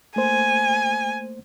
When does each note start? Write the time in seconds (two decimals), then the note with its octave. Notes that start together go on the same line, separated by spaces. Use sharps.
0.16 A3 A#3 C5 G#5